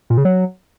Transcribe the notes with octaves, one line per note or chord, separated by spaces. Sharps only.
A#2
C#3
F#3